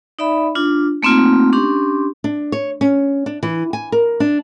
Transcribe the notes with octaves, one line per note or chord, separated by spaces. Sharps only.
D#4 D5 E5 B5
D4 F4
A3 A#3 C4 D#4 F4
C#4 D4 G4 C6
D4
C#5
C#4
D4
E3
G#5
A#4
D4